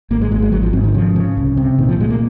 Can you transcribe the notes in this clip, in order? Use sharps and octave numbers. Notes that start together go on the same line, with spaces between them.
G#1 A#3
G#3
G#1 G#3
G#3
G#1 F#3
F3
G#2 C4
D#3
C#3 F3
C#3
C2
C3
A#2 D#3
F3
A#2 G#3
A#3